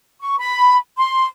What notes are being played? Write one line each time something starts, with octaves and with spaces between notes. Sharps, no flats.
C#6
B5
C6